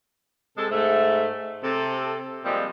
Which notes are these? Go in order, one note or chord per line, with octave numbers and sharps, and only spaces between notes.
C3 G#3 A4
G#2 A3
C3 A4
A#2 F3 G3 G#3 C4